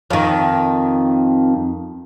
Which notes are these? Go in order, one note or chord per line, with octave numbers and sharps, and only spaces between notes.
F2 D#3